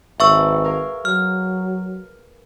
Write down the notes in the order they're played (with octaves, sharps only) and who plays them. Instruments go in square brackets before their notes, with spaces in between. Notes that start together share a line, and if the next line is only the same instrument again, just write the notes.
[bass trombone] G#1 [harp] B4 [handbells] E5 C#6 E6
[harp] G#4 A#4 F5
[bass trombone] F#3 [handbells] F6